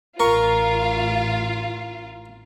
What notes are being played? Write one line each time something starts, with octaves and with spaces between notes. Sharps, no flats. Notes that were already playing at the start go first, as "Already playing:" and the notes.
A1 F4 A#4 F5 C#6